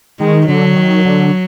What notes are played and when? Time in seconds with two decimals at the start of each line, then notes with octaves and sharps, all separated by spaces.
0.20 D#3 G#3
0.48 D3 F#3
0.76 D#3
1.05 D3